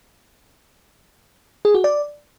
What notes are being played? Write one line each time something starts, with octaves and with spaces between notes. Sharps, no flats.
G#4
F#4
D5